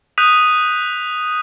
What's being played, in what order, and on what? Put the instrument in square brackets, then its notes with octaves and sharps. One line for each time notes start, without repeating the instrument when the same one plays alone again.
[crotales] D#6 F#6 G6 B6 D#7 F7